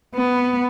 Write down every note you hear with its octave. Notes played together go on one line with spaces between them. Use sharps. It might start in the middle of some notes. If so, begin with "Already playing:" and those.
B3